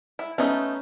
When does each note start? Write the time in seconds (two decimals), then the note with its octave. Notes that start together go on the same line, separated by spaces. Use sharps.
0.19 E4
0.38 A3 B3 C#4 D#4